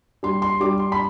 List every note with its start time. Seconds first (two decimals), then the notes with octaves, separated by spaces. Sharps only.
0.23 G3 C6
0.42 C6
0.61 G3 D6
0.79 C6
0.92 B5